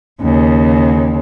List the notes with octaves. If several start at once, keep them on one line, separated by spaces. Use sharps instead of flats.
D#2 C#3